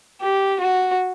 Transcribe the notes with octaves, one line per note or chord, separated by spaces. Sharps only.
G4
F#4